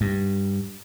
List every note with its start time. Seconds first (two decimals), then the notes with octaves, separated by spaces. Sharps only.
0.01 G2